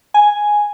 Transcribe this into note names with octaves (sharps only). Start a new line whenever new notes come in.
G#5